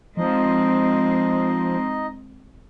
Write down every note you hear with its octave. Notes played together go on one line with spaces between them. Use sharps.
F3 G#3 C4 D#4 D#5